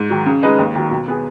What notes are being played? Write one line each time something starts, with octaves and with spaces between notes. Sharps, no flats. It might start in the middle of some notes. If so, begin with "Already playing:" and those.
Already playing: G#2
D#3 F#3
C#3
G#3 D#4 B4 D#5
D#2
D#3 F#3
B2
B3 G#4